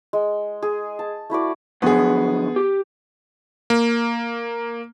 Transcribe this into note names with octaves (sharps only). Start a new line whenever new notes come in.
G#3
G#4
A5
A3 E4 F#4 D5
D3 F3 F#3 B3 G#4
G4
A#3